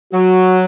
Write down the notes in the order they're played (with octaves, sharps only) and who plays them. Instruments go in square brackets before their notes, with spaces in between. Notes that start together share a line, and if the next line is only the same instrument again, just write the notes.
[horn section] F#3 [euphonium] F#4